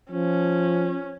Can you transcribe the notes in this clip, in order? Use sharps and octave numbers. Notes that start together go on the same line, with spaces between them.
F3 C#4